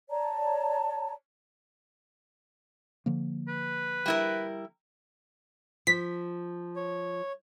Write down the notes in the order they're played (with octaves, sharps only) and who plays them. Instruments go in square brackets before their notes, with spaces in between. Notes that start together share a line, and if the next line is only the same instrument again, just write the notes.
[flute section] C#5 D5 A5 A#5
[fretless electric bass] D3 F3 A#3
[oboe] B4
[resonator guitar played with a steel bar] G3 E4 A#4
[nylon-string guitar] F3 [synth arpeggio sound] B6
[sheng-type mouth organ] C#5